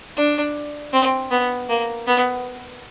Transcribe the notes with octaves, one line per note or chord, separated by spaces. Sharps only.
D4
C4
B3
A#3
B3